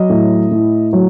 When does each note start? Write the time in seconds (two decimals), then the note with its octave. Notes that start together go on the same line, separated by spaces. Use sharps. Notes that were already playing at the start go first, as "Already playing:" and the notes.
Already playing: F#3 D#5
0.09 A2
0.51 A2
0.93 F#3